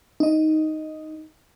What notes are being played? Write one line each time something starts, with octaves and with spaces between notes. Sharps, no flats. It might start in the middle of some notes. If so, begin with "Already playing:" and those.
D#4 D#5